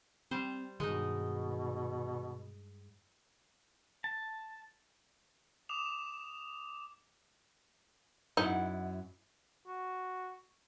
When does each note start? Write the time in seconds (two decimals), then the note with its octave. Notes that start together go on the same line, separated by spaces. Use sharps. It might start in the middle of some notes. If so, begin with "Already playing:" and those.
0.31 G3 C4 C5
0.80 G2 B2 D#3 G#3 D#4
4.04 A5
5.69 D6 D#6 E7 F7
8.37 F#2 D#4 E4 F#5
9.67 F#4